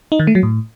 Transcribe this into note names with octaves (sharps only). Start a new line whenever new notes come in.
D#4
D#3
A3
F#3
A2